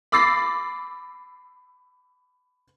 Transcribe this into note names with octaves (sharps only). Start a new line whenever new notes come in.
B5 D6 E6 A6 A#6 C7